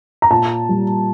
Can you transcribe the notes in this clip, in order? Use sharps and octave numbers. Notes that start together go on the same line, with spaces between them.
A#5
A#2 A5
G3